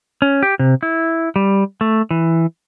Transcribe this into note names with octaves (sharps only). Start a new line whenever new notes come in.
C#4
G4
C3
E4
G3
A3
E3